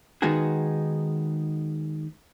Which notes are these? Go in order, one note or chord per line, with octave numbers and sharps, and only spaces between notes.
D#3 G#3 B3 D#4 F#4 G#4